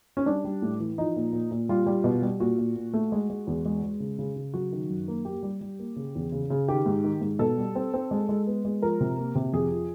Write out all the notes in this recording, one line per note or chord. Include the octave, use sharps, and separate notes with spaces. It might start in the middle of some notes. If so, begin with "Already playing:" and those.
C#4
G3 D4
G3
A2
E3
F3 D#4
A#2
A#2
A#2
G3 F4
G3
B2
G3
A#2 F#4
A#2
A#2
A3
G#3
G#3
E2
G#3
G#3
C#3
C#3
C#3
F#3 F#4
D#3
F#2
A#3
A#3 G4
G3
G3
A#3
C#3
E2
C#3
C#3
D#3 G4
G#2
D#3
G#2
B2 A4
G3
C4
C4
G#3
G#3
B3
G#3
F3 A#4
C3
A#3
C3
F2 G#4
F3